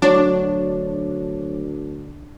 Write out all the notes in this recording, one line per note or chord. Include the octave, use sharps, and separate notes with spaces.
D2 F#3 D4 C#5